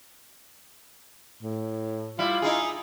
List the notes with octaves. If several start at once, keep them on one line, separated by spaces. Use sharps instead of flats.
A2
G3 E4 F4
D#4 E4 G#4